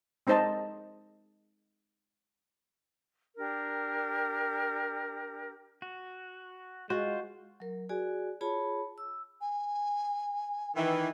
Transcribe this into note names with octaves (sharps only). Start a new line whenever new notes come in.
G#3 C4 D#4 C5 D#5 A5
D4 G4 A#4
F#4
G#3 F4 F#4 C5
F#3 A#4
F#4 G#4 D5 G#5
F4 G#4 C#5 A5 B5
E6
G#5
D#3 E3 G5